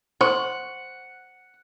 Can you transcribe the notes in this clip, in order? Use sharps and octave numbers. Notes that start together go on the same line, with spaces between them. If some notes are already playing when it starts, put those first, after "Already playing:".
C5 F#5 C6 C#6